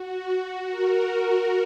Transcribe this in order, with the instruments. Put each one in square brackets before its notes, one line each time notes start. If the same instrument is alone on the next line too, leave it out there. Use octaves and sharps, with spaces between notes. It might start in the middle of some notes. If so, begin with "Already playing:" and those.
Already playing: [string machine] F#4
F#4 A#4